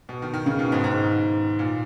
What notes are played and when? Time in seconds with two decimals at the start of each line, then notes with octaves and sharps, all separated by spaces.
0.09 B2
0.22 D#3
0.33 D#3
0.46 C#3
0.59 B2
0.72 G#2
0.84 G#2
1.59 A#2